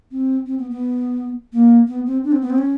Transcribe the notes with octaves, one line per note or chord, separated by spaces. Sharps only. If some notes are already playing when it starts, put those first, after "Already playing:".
C4
C4
B3
B3
A#3
B3
C4
D4
C4
B3
C4
C#4